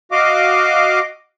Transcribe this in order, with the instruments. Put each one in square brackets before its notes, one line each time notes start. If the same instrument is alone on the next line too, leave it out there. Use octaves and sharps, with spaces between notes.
[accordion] F#4 D#5 F5 D6